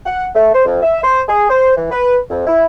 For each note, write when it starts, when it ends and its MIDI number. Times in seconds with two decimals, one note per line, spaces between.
0.06 0.26 78
0.35 0.51 57
0.54 0.63 72
0.66 0.81 41
0.82 1.00 76
1.03 1.21 72
1.29 1.48 68
1.50 1.76 72
1.77 1.90 52
1.91 2.18 71
2.30 2.43 41
2.47 2.66 64